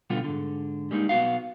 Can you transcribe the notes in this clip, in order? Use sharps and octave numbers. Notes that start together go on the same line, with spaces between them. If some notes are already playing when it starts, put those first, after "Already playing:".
B2 D3 G3 B3 F4
G#2 D3
G3 G#3 A#3 C4 D#4
B1 B3 F#4 F5